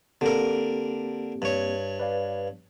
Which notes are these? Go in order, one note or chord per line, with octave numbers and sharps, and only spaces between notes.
D3 A#3 C4 G4 A#4
G2 C#5
B4 D5 F5